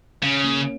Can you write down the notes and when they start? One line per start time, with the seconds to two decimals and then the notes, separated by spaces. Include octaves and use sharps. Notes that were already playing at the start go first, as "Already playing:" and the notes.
0.23 C#3 C#4
0.44 A#3 C#4